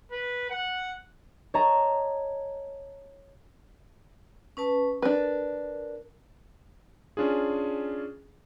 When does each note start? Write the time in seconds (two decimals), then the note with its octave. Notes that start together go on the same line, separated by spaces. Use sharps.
0.12 B4
0.50 F#5
1.54 C#5 D#5 A5 A#5
4.57 C#4 B4 A5
5.02 D4 A#4 B4
7.17 C#4 D4 F4 G#4